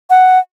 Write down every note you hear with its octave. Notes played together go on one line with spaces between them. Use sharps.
F#5